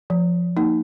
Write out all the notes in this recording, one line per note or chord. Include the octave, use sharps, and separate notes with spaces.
F3
A#3 D#4